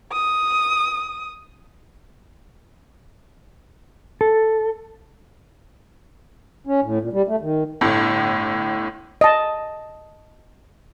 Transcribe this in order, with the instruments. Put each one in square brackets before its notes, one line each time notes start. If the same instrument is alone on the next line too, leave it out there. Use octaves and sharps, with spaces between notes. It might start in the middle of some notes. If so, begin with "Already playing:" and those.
[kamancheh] D#6
[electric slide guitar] A4
[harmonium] C#4
A2
A#2
G3
A3
D#3
[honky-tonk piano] G1 A2
[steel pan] D#5 A5